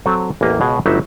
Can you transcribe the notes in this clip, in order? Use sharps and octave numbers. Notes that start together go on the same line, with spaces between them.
F#3 C4 A4
A1 E2 A#3 G4 G#5
C#2 B2 F#4 G#4 C#5
G1 F#3 G3 A3 D#4 E5